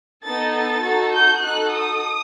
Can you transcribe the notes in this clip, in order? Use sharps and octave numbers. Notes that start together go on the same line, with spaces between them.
B3 D#4 A4 A6
A6
D#4 F#4 A4
G6
D#4 F#4 A4 F#6
D#6